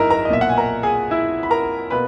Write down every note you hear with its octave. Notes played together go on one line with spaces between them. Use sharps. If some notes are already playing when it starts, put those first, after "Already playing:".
Already playing: G#1 F#2 D#4 E4 A#4 E5 A#5
A#4 A#5
D#5
B1 A#2 A#3 E5
F#5
G#5
A#4 A#5
G#4 G#5
E4 E5
B5
A#4 A#5
B2 A#3 B4 B5